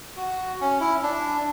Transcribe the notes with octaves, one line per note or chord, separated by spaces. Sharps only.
F#4
C#4
E4
D4